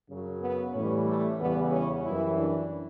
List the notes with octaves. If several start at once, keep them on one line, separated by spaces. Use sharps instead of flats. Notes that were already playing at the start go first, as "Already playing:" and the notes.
F#2 C#3 F#3
B3
A2 E3 G3 C#4
A3
E2 C#3 E3 G3 B3
C#4
F#2 E3 G3 E4
D4